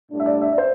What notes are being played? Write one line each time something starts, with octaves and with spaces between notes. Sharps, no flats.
A2 G3 D4
E5
D5
E5
D5
C5